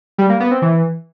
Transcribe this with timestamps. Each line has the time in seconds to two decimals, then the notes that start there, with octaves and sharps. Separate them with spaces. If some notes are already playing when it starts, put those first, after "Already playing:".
0.18 G3
0.29 A#3
0.40 B3
0.51 C4
0.62 E3